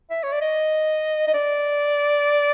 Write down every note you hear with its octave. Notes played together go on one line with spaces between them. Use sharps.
E5
C#5
D5
D#5
D#5
D5